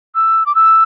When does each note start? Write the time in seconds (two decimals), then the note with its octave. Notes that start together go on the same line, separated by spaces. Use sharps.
0.15 E6
0.46 D6
0.55 E6